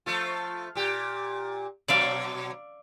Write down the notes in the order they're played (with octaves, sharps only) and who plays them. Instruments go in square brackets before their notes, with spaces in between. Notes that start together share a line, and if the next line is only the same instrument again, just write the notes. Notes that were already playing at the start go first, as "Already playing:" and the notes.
[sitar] F3 A3 F4
A#2 G4
[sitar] B2 F#3 [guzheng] D5 E5 F5